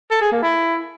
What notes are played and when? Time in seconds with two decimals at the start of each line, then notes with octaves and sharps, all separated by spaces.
0.11 A4
0.21 G#4
0.32 A#3
0.42 E4